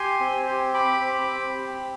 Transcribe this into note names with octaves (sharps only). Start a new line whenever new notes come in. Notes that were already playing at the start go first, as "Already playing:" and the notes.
Already playing: G4 G#5 C6
C4
G4
G4 B5 D6
C4
C4
G4